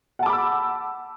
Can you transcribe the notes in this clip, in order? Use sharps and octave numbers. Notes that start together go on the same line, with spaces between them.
F#5 A5 B5 D6 E6